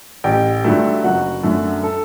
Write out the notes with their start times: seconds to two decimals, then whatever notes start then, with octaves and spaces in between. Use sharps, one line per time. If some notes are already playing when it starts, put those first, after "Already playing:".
0.24 A1 G4 G5
0.64 G2 D3 F#3 A3
1.04 F#1 F#4 F#5
1.43 F#2 D3 F#3 A3
1.83 A4